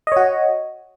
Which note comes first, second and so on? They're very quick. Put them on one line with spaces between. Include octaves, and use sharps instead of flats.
D#5 C#5 F#4